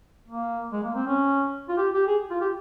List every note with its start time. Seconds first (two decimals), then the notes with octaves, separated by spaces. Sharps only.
0.28 A#3
0.73 G#3
0.84 A#3
0.95 C4
1.07 C#4
1.69 F4
1.77 G4
1.93 G4
2.07 G#4
2.31 F4
2.41 G4